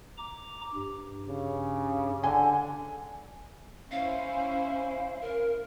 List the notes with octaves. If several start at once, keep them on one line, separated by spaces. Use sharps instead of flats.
A#5 D6
G2 G4
C#3
D3 G#5
C#4 E4 C5 F5
A#4